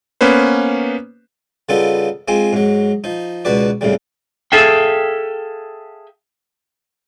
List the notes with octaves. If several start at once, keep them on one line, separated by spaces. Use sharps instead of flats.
A#3 B3 C#4 B4 C5
C#3 G3 B3 D#4 F4 A4
G#3 C4 F4 G#5
G#2 F#3
F3 D#4
C#2 B2 F#4 B4 D5
C2 A2 C#3 G3
G#4 A4 E5 F5 G5